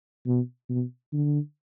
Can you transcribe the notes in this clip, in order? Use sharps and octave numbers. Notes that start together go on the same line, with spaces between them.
B2
B2
D3